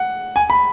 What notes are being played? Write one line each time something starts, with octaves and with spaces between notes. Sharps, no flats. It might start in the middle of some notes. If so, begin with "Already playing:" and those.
Already playing: F#5
G#5
B5